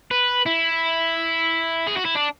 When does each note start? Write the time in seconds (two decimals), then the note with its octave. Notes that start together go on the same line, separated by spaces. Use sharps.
0.11 B4
0.46 E4
1.87 G#4
1.96 F#4
2.05 E4
2.15 D4